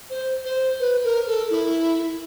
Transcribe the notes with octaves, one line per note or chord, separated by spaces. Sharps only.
C5
C5
B4
A#4
A4
E4